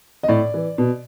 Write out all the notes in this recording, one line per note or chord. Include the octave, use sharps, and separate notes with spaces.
D#5
A2 D5
E3
B2